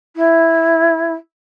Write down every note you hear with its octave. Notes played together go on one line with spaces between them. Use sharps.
E4